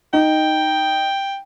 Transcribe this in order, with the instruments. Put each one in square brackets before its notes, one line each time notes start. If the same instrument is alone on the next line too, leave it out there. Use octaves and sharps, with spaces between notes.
[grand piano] D#4 [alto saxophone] G5